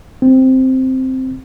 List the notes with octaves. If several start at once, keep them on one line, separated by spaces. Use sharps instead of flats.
C4